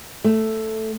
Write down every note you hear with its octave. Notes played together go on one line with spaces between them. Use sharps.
A3